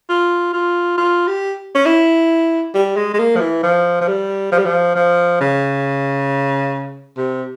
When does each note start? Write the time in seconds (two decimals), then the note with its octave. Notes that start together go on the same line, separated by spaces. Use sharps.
0.09 F4
0.53 F4
0.97 F4
1.27 G4
1.75 C#4
1.86 E4
2.74 G3
2.97 G#3
3.14 G#3
3.19 A#3
3.36 F3
3.40 E3
3.63 F3
4.01 F3
4.08 G3
4.52 F3
4.58 G3
4.65 F3
4.96 F3
5.40 C#3
7.17 C3